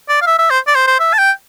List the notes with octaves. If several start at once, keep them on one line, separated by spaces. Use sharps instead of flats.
D5
F5
E5
E5
C5
D5
C5
C5
E5
A5
G5